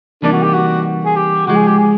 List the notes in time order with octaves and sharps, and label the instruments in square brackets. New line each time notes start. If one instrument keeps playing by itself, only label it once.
[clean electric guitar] C3 E3 G3 A#3 D#4 [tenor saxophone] D4
[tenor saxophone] F#4
G4
F#4
G#4
G4
[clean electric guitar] C#3 F3 G#3 [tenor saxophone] F#4
[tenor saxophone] G#4
G4
G#4